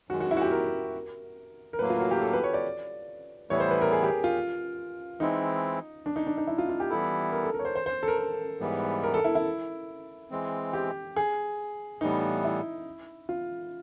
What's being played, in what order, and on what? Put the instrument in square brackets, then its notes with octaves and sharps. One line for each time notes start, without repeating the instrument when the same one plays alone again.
[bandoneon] F#2 D#3 G#3 [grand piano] F#4
[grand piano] F#4
E4
F#4
G4
A#4
A#4
[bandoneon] A2 F#3 A#3 [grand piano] B4
[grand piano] F4
F#4
G4
A4
B4
C#5
D5
[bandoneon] A2 E3 G3 B3 E4 [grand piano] C#5
[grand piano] C5
B4
A#4
G#4
G4
F4
[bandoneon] E3 G#3 C4 E4 [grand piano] D#4
[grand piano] D4
D#4
D4
D#4
E4
F4
F4
G4
[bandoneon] E3 G3 B3 E4 [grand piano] A4
[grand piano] A#4
A4
A#4
C#5
C5
C5
C5
A4
A#4
A#4
[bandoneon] G#2 E3 G3 B3
[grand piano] A#4
A4
E4
E4
[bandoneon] E3 G#3 C4
[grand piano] G4
G#4
[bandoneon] A2 E3 G3 B3 [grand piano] D#4
[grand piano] E4
F4